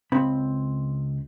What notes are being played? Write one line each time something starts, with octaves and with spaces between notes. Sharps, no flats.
C#2 C4 B5